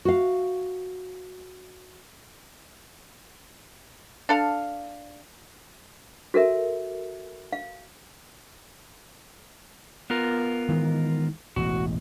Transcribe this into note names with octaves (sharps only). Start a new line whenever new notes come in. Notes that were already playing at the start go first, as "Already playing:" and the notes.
F#4 F5
D4 A4 F5
F#4 A4 A#4 E5
F5
B3 F4 A#4
D#3 E3 G#3
E1 A1 F#4